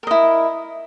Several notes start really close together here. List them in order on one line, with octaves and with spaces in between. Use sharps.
A#4 D#5 E4